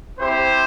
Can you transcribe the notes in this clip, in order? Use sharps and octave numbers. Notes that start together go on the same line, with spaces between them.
C4 E4 G4 C5